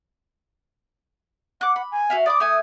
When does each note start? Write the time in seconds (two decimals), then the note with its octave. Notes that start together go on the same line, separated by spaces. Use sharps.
1.61 F#5 D6 F#6
1.76 B5
1.92 G#5
2.10 F#4 E5 F5
2.26 D5 B5 D6 D#6
2.40 A3 E5 G#5